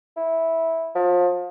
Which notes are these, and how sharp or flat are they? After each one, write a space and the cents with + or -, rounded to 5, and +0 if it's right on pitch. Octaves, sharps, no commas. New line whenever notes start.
E4 -10
F3 +30